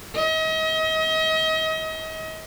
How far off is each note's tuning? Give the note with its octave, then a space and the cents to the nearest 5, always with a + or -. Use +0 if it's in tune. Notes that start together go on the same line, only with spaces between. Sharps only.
D#5 +40